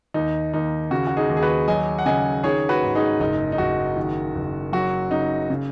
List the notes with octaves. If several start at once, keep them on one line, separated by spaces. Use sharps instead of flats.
D#2 D#4
D#2 D#4
C#3 F#4
F#4
D#4 G#4
D#2
G#4
F#4 B4
F#3 D#5 G#5
F#5
C#3 D#5 G#5
D#3 G#4 C#5
F#4 B4
G#2
D#4 G#4
F#1 D#4
D#4
F#1 F#4
D#3
F#1
F#3 F#4
C#3 D#4
C#3